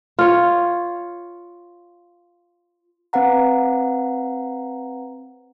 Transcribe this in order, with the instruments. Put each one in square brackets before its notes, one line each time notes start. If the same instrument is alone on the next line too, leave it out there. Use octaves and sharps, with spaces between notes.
[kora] F4 C#5
[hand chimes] C4 B4 F5 F#5 A#5